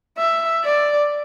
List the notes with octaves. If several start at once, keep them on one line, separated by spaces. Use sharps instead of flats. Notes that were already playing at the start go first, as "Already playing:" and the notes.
E5
D5